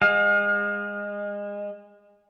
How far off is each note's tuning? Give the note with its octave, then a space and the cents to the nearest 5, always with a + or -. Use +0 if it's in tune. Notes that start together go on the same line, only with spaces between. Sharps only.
G#3 -25 F5 +35